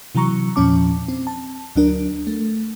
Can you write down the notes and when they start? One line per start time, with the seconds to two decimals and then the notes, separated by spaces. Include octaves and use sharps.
0.15 C3 E3 F#3 A#5 C#6 C#7
0.56 E2 A#2 F3 C#4 A5 D6
1.08 C4
1.27 A5
1.76 D2 F#3 D4 A#4
2.27 A3